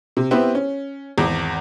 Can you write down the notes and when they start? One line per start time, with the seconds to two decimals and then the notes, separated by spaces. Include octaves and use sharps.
0.17 C3
0.31 B3 C4 E4 G4 B4 C5
0.55 C#4
1.18 G#1 E2